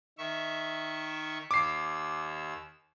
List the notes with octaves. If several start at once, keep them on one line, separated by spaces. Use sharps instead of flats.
D#3 E5 C#6
D#2 D6 E6 C7